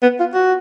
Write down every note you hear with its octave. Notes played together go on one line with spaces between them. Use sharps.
B3
F4
F#4